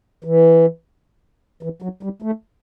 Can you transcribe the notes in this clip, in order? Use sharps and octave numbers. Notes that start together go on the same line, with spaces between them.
E3
E3
F#3
G3
A3